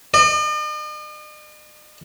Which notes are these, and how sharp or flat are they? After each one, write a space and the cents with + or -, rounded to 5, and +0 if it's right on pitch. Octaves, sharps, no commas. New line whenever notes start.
D#5 -45